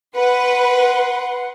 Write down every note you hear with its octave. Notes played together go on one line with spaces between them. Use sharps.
B4 F#5 C6